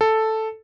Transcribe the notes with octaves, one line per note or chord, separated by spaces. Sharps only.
A4